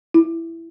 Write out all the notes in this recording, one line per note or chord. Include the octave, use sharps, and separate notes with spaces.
E4